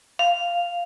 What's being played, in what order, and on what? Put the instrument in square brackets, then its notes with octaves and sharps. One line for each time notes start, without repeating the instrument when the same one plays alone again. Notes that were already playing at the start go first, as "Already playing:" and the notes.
[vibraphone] F5